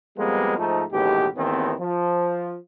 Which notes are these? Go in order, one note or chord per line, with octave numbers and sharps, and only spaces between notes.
F2 G3 G#3 A#3 B3
G#2 F3 A3 D#4
A1 D#2 B2 G#3 G4
G#1 D#2 D#3 E3 B3 C4
F3